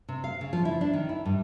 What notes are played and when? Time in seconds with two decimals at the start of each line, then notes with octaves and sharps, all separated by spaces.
0.09 C3
0.24 F5
0.41 C#3
0.53 F3
0.65 E4
0.81 D4
0.93 D#3
1.09 E4
1.25 G2